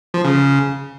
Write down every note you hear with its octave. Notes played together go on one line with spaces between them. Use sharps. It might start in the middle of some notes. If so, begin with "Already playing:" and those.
F3
C#3
C#3